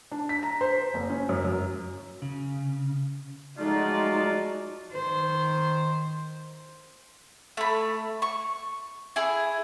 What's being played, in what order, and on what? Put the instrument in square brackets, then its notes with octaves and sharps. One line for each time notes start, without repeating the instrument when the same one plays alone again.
[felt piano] D4
B6
A#5
C5
C5
F#1
C#4
F#2
F#2
[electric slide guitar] C#3
[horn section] F3 F#3 F#4 [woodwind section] G#3 F4 [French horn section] A3 D5 [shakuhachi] D#4
[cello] D#3 C5
[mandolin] A3 B5
C#6
E4 G#4